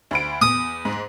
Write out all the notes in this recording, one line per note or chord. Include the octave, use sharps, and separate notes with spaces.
D2 B5 D7
E2 D#6
G#2